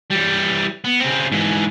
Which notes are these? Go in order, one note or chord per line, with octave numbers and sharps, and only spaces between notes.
E3 G3
B3
C#3 C4
G#2 E3